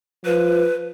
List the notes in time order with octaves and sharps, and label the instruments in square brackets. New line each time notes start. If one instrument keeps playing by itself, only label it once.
[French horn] F3 [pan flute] B4